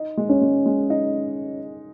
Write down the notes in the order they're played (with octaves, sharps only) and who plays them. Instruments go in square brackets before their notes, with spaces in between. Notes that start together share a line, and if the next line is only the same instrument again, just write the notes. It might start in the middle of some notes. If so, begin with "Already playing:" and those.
Already playing: [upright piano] D#4
G#3
[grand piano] C#4
[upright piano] G#3
G#3
D#4